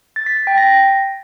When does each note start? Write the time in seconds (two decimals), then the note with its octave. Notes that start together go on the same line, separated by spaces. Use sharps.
0.16 A6
0.26 B6
0.37 B6
0.47 G5
0.57 A#6